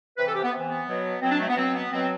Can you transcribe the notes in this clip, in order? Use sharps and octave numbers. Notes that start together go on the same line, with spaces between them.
C3 E3 B4
A4
G4
B3
C3 E3
B3
B2 F#3
B2 F#3 C4
D4
A3
B3
B2 F#3 C4
B3
B2 F#3 C4